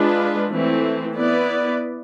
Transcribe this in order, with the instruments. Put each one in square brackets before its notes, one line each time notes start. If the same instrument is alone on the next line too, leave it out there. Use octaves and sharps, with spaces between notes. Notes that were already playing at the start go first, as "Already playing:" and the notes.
Already playing: [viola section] G#3 D4 F4 B4
E3 A3 C4
B3 E4 B4 D5